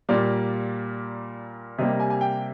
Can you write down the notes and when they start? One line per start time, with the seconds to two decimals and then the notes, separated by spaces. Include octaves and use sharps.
0.09 A#2 G3 A#3 D5
1.78 C3 G3 A#3 D#5
2.00 G#5
2.10 G#5
2.21 G5